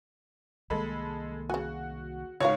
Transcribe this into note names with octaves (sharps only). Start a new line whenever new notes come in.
C2 D#3 G#3 A#3 A4 B5
C#3 F#4 G#5
C#2 G#2 F4 F#4 C#5 F5